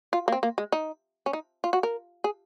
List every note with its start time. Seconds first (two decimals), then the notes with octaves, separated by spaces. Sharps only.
0.13 F4
0.28 A#3
0.32 C4
0.43 A#3
0.58 G#3
0.72 D#4
1.26 C#4
1.33 D#4
1.64 F4
1.73 F#4
1.83 A#4
2.24 G#4